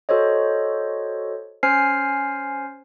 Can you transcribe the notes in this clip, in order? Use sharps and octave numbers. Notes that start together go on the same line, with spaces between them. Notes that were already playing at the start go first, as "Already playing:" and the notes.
F#4 A4 C5 C#5 D#5
C#4 C5 G#5 F6 C7